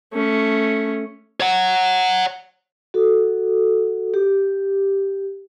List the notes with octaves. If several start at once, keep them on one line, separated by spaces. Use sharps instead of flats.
A3 C#4
C#5 F#5
F#4 A4
G4